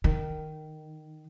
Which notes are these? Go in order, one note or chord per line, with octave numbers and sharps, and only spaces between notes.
D#3